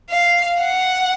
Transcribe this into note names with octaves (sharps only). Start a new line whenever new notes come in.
F5
F#5